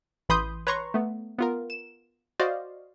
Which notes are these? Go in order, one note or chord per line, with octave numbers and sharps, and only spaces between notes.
A1 E3 B5 C6 D#6 G6
B4 C#5 A#5 C6 C#6
A3 B3
B3 F4 A#4
E7
F#4 C5 D5 D#5 F5